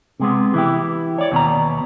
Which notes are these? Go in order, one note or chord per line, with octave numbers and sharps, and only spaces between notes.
C3 G#3 B3
E3 E4 G4
C#5 D5
D#2 B2 B3 A#5